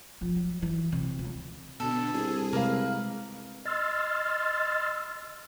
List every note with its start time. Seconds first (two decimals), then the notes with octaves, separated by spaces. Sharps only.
0.21 F3 F4
0.36 F#3
0.62 F#2 E3
0.92 C3
1.19 C#2
1.80 B2 D3 A4
2.14 C2 G#4
2.53 C3 G#3 A#3 B4 F5
3.65 D#5 C6 E6 F6 A6